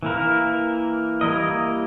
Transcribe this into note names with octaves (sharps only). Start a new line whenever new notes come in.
E3 A#3 E4 A#4
G3 A#3 E4 A#4 D#5